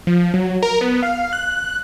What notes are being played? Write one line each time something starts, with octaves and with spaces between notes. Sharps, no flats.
F3
F#3
A#4
B3
F5
F#6